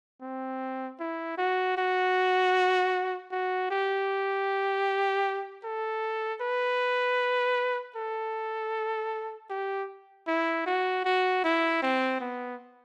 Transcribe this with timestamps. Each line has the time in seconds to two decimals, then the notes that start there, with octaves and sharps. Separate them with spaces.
0.22 C4
1.00 E4
1.38 F#4
1.77 F#4
3.32 F#4
3.71 G4
5.64 A4
6.41 B4
7.96 A4
9.50 G4
10.28 E4
10.66 F#4
11.05 F#4
11.44 E4
11.82 C4
12.21 B3